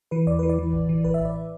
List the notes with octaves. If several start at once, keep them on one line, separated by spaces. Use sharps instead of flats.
E3 B4
E2 D5
E3 B4
D5
E3
A1
E3
A1 B4
E5
A1
D5